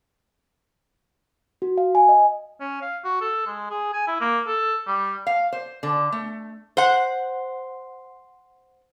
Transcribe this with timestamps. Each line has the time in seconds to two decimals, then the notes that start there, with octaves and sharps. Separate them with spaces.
1.62 F#4
1.78 F5
1.95 G#5
2.09 D#5
2.61 C#4
2.82 F5
3.04 F#4
3.21 A4
3.47 G#3
3.70 G#4
3.93 G#5
4.07 E4
4.21 A#3
4.47 A4
4.87 G3
5.27 F5
5.52 C5
5.83 D3
6.12 A3
6.77 C5 F#5